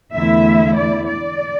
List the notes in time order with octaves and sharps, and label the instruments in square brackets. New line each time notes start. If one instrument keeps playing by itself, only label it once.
[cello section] E2 D3 A3 E4 E5
D5
D5